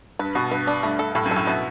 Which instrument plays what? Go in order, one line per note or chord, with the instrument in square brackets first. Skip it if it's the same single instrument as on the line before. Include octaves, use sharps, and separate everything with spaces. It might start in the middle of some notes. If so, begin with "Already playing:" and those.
[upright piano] G2 [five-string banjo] B4
[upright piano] B2 [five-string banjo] F#4
[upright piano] G2 [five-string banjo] B4
[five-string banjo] D4
[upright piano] G2 [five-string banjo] A3
[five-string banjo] A4
[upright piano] A2 [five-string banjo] A4
[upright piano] F#2
[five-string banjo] A4
[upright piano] A2
[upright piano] B2 [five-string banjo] E4